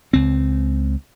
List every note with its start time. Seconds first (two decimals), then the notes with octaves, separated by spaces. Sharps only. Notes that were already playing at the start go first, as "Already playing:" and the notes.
0.13 C#2 C4